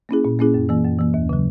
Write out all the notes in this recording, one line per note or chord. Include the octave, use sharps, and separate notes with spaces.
A#3 C#4 E4 G#4
A#2
A#3 C#4 E4 G#4
F#2
E3 A#3
F#2
E3 A#3
D#2
C#3 F#3